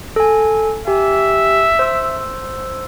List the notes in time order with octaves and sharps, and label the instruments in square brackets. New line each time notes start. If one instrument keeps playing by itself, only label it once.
[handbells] A4 G#5
[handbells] G4 G#5 [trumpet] E5
[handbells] C5 E6